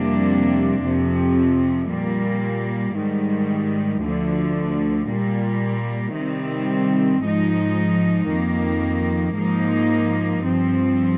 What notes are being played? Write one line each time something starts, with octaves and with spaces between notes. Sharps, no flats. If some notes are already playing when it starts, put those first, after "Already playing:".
Already playing: F2 C3 G3 A#3 D4
F2 C3 F3
A#2 G3 A#3
G#2 D#3 G3
D2 D3 F3
A#2 G3 A#3
C3 D#3 G3 C4
G#2 F3 G#3 D#4
F2 D#3 A#3
G#2 F3 A#3 D#4
G2 F3 C4